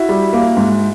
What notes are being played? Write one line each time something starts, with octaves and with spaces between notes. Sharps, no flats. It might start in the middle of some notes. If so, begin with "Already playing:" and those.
Already playing: E4 F#4
G3
A#3
G#2